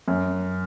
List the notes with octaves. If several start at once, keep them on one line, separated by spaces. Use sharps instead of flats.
F#2